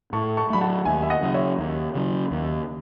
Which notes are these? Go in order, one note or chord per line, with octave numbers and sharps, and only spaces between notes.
A2 A5 C#6
A5 C#6
F#3 A3 B5
F#5 A5
D#2 E5 G#5
E5
D#5 F#5
C#3 F#3
C#5 E5
D#2
C#3 F#3
D#2